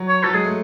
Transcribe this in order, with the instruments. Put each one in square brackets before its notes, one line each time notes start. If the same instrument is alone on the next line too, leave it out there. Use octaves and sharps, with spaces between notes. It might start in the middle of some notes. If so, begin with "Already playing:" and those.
Already playing: [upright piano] F#3
[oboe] C#5
[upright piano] F#3 [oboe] A4
[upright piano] G#3 [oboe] G#4
[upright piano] A3